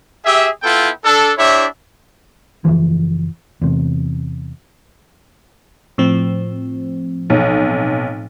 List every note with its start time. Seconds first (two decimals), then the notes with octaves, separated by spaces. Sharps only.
0.25 G4 G#4 E5
0.63 B3 E4 F4 A4 G5
1.04 D4 A4
1.37 D4 E4 G4 C#5 E5
2.65 F#1 D#2 E3 F3
3.61 E2 C3
5.98 A2 F3 C4
7.30 B1